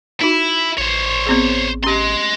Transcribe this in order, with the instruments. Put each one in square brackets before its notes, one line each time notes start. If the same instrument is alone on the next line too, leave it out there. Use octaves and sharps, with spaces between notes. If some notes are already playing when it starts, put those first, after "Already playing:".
[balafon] D#4 F#4 [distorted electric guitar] E4
[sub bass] A1 [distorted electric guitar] C5 C#5
[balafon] B3 C4 G#4
[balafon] C#4 G4 [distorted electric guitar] D#5 C6